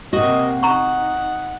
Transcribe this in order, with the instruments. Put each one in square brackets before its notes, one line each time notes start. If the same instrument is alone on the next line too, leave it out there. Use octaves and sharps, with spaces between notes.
[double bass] C3 A#3 [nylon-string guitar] F#4 [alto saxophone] D#5
[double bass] D#4 [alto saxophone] F#5 [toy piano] A#5 C#6